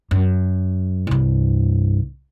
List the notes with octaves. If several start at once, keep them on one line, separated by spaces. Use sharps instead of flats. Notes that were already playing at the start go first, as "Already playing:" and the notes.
F#2
C2 G2